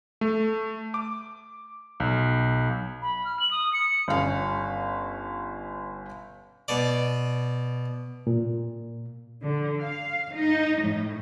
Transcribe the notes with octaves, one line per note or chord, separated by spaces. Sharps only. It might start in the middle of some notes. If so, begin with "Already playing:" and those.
A3
D6
B1
B5
F6
F#7
D#6
C#7
G1 C#4 F5
B2 D5
A#2
D3
F5
D#4
A2